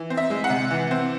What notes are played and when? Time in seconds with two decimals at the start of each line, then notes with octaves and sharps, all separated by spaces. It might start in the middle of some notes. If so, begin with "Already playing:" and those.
Already playing: E3
0.10 C4
0.17 E5
0.30 G#3
0.44 F#5
0.50 C3
0.71 E3
0.91 C4